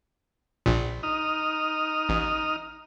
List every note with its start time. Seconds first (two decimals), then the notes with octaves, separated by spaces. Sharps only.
0.66 A#1 A#2
1.03 D#4 D#6 F6
2.09 A1